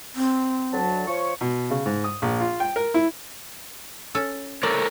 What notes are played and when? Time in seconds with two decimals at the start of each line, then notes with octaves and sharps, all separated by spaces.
0.16 C4
0.73 D2 F#3 A5
1.07 F3 C#5 C#6
1.41 B2
1.71 C#3
1.86 G#2
2.04 D#6
2.22 A#1
2.40 F4
2.60 G5
2.76 A#4
2.94 E4
4.15 C#4 A4
4.63 A4 A#4 C#5 D5